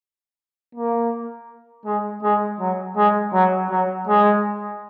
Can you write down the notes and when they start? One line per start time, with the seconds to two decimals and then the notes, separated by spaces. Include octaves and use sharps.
0.75 A#3
1.85 G#3
2.23 G#3
2.60 F#3
2.97 G#3
3.33 F#3
3.70 F#3
4.08 G#3